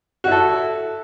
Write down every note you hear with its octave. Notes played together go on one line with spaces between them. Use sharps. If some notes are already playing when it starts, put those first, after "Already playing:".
E4 F#4 A4